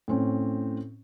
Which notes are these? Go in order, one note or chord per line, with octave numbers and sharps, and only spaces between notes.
A2 C4 C#4